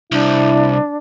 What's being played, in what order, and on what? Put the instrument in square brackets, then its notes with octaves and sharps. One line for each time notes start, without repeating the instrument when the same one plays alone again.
[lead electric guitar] C2 [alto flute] D4 [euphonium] E4